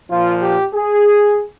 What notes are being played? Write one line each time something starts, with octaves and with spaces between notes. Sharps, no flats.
A#2 F3 F4
G4
G#4